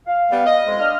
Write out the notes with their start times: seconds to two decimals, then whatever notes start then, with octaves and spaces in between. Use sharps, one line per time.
0.07 F5
0.31 G3 B3
0.46 D#5
0.67 F2 G#3
0.80 D4 F5 F6